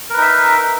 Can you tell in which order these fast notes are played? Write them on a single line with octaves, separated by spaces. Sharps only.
A#4 B4 D#4 E5